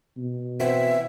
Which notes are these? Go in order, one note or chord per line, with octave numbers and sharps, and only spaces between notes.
B2
E3 C4 F#4 E5